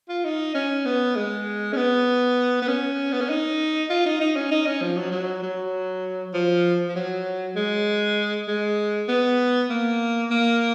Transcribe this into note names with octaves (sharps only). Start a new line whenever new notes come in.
F4
D#4
C#4
B3
G#3
C#4
B3
B3
C#4
B3
C#4
D#4
F4
D#4
D#4
C#4
D#4
C#4
F3
F#3
F#3
F#3
F3
F3
F#3
G#3
G#3
B3
A#3
A#3